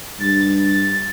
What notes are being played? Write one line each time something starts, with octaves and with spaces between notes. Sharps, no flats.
G2 A6